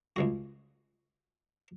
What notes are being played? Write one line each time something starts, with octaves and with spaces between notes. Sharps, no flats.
C#2 C#3 F#4